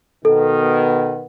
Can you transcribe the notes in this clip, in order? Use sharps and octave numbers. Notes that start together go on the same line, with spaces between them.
B2 D#3 B3 A4